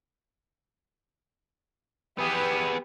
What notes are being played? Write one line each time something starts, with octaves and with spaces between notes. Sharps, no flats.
B3 G4 G#4 B4